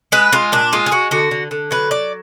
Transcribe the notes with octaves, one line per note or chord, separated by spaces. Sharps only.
G#3 B4
G#3 F4
A#2 D4
G#3 F4
G#4
G#3 F#4
D3 F#4
D3
D3
F#3 B4
F#3 D5